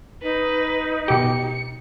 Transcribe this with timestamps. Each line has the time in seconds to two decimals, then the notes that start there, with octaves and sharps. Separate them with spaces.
0.23 D#4 B4
1.08 B2 G4 C#7